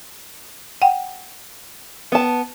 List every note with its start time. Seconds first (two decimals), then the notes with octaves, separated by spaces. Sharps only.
0.82 F#5 G5
2.12 B3 A5